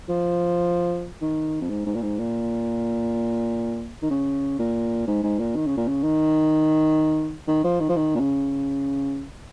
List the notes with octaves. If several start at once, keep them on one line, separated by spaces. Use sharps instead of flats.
F3
D#3
F2
G#2
G#2
A#2
G#2
A#2
D#3
C#3
A#2
G#2
G#2
A#2
D#3
C#3
A#2
C#3
D#3
D#3
F3
D#3
F3
D#3
A#2
C#3